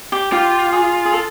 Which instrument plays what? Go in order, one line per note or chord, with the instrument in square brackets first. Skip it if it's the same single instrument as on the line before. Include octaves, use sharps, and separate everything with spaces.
[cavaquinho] G4
[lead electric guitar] F4 [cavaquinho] G4
[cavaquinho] G#4
G#4
A4